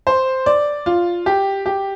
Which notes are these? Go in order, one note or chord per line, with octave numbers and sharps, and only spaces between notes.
C5
D5
F4
G4
G4